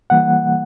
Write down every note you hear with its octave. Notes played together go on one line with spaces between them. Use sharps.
E3 G3 A#3 F#5